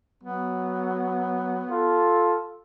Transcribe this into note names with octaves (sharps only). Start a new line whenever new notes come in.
F#3 B3
F4 A4